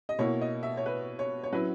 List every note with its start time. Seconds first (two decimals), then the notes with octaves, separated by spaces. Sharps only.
0.09 D#5
0.19 B2 A#3 E4 C#5
0.41 D#5
0.63 E5
0.77 C#5
0.86 B4
1.19 C#5
1.44 C#5
1.52 F#3 C#4 E4 B4